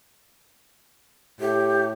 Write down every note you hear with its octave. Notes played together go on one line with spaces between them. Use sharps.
A2 G4